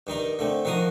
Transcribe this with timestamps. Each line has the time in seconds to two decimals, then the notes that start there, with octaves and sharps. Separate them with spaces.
0.07 G2 D#3 D#4 A#5
0.39 D3 A3 C4
0.65 D#3 F3 F#4 A#5 D#6